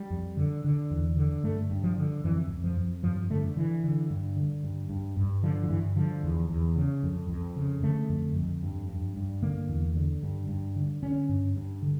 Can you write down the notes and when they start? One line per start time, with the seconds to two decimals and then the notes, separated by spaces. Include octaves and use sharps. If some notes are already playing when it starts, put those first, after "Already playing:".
Already playing: G3
0.10 F2
0.37 D3
0.64 D3
0.91 E2
1.17 D3
1.43 G2 A3
1.70 G2
1.84 F3
1.97 D3
2.24 F2 E3
2.50 F2
2.64 F3
2.77 F2
3.03 G2 F3
3.30 D3 A3
3.56 D3 E3
3.84 D3
4.10 G2
4.37 D3
4.63 G2
4.90 G2
5.17 G2
5.43 D3 F3
5.64 F3
5.69 G2 E3
5.96 D3 F3
6.23 E2
6.49 E2
6.76 C#3
7.03 F2
7.29 F2
7.56 C#3
7.83 D3 A3
8.09 F2
8.36 F2
8.63 G2
8.89 G2
9.17 G2
9.42 D3 A#3
9.69 E2
9.96 D3
10.23 G2
10.49 G2
10.76 D3
11.03 D3 C#4
11.29 G2
11.56 G2
11.82 D3